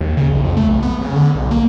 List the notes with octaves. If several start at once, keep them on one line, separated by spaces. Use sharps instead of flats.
D#2
C#3
B1
F2
A3
B1
B3
C#3
D3
B1
A#3